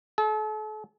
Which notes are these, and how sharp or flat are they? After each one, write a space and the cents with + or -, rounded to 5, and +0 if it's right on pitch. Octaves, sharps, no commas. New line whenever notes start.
A4 -40